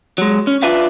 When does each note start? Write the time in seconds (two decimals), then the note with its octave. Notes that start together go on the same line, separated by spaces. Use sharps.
0.18 F#3 G#3
0.47 C#4
0.63 D4 F4 B4 E5 F5